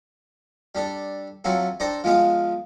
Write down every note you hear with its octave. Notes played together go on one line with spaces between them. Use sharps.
G3 D4 A4
C3 F#3 C4 F4 A4
D4 A4 C5 G5 A#5
F3 G#3 B3 F5